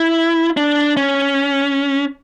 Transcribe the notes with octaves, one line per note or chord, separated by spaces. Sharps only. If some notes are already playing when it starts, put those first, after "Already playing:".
Already playing: E4
D4
C#4